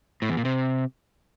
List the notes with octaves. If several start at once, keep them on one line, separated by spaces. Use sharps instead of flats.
A2
E2
A#2
C3